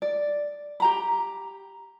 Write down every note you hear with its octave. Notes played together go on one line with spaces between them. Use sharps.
D5
G4 A#5 B5